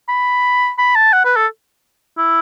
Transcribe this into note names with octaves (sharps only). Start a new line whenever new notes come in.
B5
B5
A5
F#5
B4
A4
E4